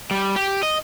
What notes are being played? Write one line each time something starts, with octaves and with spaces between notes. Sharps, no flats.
G3
G4
D#5